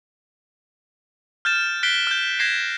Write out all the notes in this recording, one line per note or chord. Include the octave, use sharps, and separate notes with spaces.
F6 G6 A6 E7
F#6 B6 C7 D7 G7
F6 G6
G6 G#6 A#6 C7 E7